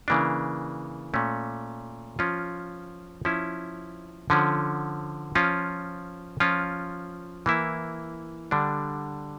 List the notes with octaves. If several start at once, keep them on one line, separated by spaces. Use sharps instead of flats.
C#3 E3 A#3 D4
A#2 A3 C#4
F3 C#4 F4
F3 C#4 E4
D3 F3 C#4
F3 C#4 F4
F3 C#4 F4
E3 A#3 E4
D3 G3 D4